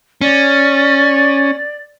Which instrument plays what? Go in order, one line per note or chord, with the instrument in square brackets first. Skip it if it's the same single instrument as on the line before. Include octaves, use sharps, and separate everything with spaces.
[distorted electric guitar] C#4 [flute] D5